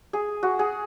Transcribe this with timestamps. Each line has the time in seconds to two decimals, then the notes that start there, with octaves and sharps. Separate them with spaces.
0.13 G#4
0.43 F#4
0.59 G#4